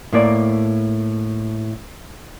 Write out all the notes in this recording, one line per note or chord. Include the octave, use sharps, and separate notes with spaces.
A2 A#3 D5